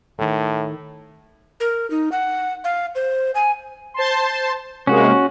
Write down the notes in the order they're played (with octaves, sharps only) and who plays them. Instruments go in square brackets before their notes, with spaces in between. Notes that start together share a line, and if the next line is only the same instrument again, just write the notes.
[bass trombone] A2 [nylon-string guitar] D#3 A3
[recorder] A#4
D#4
F#5
F5
C5
G#5
[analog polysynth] C5 A5 C6
[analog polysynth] C3 G#3 A#3 [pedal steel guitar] C#4 F#4